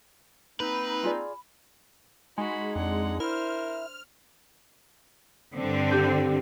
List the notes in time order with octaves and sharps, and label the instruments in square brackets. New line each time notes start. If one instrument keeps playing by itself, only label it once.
[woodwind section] A#3 C4 D#4 [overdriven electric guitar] B4 [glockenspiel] B5
[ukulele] F4 G#4 D5
[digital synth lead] G#3 [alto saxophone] D#4 [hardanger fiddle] F#4 B5
[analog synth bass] F2 [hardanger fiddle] D4 F#5
[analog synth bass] E4 [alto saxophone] A#4 [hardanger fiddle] C5 [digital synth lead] F6
[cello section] G2 D3 C4
[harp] G4 G6